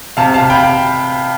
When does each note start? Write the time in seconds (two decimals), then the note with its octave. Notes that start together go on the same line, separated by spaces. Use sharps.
0.17 C3 F5 A5
0.34 F5 A5
0.40 C3
0.50 G5 B5